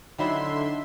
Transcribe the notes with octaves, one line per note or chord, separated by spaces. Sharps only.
D3 D#3 F#3 E4 E5 C6